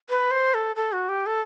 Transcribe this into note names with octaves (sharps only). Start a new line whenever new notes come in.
B4
C5
A4
A4
F#4
G4
A4